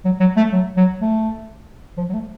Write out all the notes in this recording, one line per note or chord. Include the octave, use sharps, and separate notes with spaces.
F#3
F#3
A3
F#3
F#3
A3
F3
F#3
A3